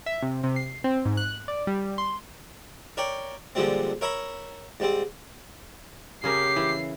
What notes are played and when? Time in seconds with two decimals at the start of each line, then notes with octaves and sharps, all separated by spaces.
0.06 E5
0.22 C3
0.43 C3
0.56 C7
0.84 C4
1.05 G#2
1.17 F#6
1.48 D5
1.67 G3
1.98 C6
2.97 A#4 C#5 D5 G5
3.55 A#2 D3 F3 G3 G#3 C4
4.01 A#4 C#5 E5 A#5 B5
4.80 G#2 G3 C4
6.24 C#3 C#4 G4 A#4 C7
6.56 E3